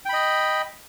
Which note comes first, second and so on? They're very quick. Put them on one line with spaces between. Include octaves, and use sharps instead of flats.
G5 B5 D#5